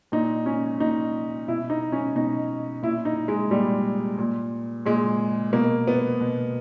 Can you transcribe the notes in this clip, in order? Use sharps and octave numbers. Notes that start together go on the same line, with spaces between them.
A#2 D#4
C#4
A#2 D#4
B2 E4
D#4
C#4
B2 D#4
A#2 E4
D#4
G#3
A#2 G3
A#2
A#2 G#3
B2 A#3
B3
B2